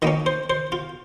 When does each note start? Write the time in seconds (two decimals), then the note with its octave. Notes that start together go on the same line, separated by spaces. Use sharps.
0.02 D#3 A#3 C#4 D#5
0.26 C5
0.50 C5
0.72 F4